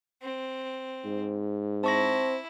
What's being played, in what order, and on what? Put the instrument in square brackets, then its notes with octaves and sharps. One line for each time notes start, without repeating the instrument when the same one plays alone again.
[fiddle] C4
[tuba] G#2
[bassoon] C4 [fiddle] E4 [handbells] A5 C#6 A#6